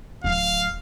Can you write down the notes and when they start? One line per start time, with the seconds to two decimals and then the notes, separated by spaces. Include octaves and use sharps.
0.24 D1 F5